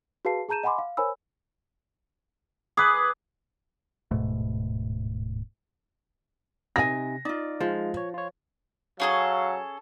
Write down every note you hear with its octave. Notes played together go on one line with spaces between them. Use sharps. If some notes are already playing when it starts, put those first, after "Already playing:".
F#4 G#4 B4 F5 A5 C7
G#4 A5 A#5 G6 D#7 E7
D#5 F#5 G#5 B5 C6 D6
F5
A#4 C5 C#5 G#5 B5 E6
G#4 B4 D6 D#6
D1 G#2 B2 A3
C3 D#4 G#5 A#6
D#4 F4 D5
F3 G#3
C#5
F4 C#5
F#3 C#4 G#4 A4 F5